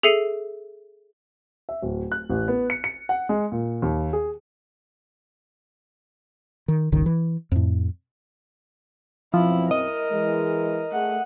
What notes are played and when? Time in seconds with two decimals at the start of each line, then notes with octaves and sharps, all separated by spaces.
0.03 G#4 A4 E5 C7 C#7 D#7
1.69 E5
1.82 D1
2.12 F#6
2.29 A1
2.48 B3
2.70 C#7
2.84 C#7
3.09 F#5
3.29 G#3
3.52 A#2
3.82 D#2
4.13 G#4
6.68 D#3
6.92 G1 C#2 D#3
7.06 E3
7.52 F2 A2
9.34 F#2 B2 F3 C4 E4
9.71 A#4 D#5
10.12 E3 G#3
10.92 A3 G#4 F#5